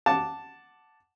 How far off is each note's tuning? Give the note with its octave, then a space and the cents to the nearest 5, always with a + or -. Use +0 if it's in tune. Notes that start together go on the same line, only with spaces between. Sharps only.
F#5 +0 A5 +0 D6 +0